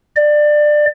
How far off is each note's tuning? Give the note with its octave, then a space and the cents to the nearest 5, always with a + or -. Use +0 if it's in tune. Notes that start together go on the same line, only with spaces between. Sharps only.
D5 +20